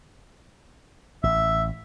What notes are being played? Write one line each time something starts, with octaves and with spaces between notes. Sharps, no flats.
A1 E5